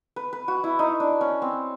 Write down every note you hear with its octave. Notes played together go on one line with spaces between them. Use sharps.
B4
B4
F#4
E4
D#4
D4
C#4
C4